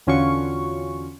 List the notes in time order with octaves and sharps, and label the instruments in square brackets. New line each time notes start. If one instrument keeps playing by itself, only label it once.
[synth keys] E2 D3 C#4 F4 F#4 C#6